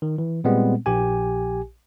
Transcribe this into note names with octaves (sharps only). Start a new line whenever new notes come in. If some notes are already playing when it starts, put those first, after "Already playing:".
D#3
E3
A#2 G3 G#3 B3 C4
A#1 G4 G#5